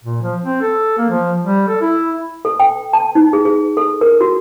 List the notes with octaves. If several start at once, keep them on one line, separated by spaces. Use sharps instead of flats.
A#2
F3
C4
A4
A#3
F3
G3
A4
E4
A4
G5
A5
D#4
G#4
G#4
A4
A#4
F#4